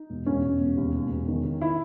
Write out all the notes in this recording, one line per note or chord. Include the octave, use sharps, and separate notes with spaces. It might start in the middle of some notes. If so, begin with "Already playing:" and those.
Already playing: D#4
E1
E1 C#4
E1
E1
D#2
E1
E1
D#3
D#3
D#3 E4